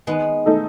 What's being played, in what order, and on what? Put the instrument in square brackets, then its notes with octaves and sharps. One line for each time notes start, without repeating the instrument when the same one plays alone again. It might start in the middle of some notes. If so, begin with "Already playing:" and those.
[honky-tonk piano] D#3 [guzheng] G#3 B3
[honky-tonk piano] A3 D#4 A4